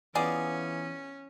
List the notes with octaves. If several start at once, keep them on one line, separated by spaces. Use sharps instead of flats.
E3 B3 C#4 F4 G#4 D5 F5